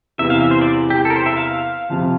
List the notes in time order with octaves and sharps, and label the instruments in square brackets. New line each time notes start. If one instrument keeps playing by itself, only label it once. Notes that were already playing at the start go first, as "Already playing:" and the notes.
[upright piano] E2 C3 E3 [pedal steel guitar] E5
[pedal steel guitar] F5
E5
C5
D5
G4
A4
A#4
C5
E5
F5
[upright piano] F2 C3 F3